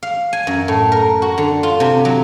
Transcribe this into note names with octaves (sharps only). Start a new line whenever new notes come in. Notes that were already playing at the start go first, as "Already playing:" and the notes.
F5
G#5
F#2
A2
A#4
F#4
D3
F4
C3
F#3